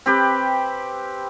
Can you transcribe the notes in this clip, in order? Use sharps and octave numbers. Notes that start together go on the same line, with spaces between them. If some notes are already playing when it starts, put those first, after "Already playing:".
C4 G4 B4